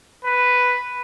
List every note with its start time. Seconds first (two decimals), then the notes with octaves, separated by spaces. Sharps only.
0.24 B4